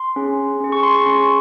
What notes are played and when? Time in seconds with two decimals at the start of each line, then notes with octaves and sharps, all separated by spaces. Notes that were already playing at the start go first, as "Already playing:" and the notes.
Already playing: C6
0.16 C#4 G#4
0.60 C#4 G#4
0.72 C#6
0.83 C6
0.95 C#6
1.06 C#4 G#4 C6